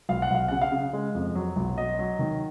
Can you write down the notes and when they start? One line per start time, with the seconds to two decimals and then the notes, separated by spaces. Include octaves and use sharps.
0.09 B1 F5
0.22 F#5
0.30 B1 F5
0.48 C#3 F#5
0.62 F5
0.72 C#3
0.93 G#3
1.15 F2
1.35 F#3
1.56 B1
1.78 F#3 D#5
1.99 F#3
2.19 D#3